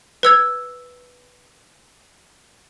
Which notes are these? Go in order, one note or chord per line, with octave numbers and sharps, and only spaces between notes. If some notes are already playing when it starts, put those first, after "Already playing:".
B4 E6 G#6